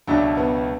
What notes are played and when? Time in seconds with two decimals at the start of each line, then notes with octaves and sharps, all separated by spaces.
0.07 C#2 B2 F#3 A3 D4
0.37 B3